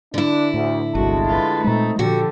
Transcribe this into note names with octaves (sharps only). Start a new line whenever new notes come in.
D3 D4 E4
D2 A2
G1 C2 G#3 A3 F#4 A5
F4 B4
A#2 G#3 A3 C4 D#4
A#2 D3 F3 F#4 G4 A4